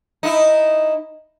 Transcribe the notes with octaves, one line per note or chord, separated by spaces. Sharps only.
D#4 E4